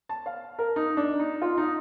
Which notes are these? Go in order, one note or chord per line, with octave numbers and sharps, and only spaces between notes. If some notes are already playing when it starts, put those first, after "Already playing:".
A5
F5
A#4
D#4
D4
D#4
F4
D#4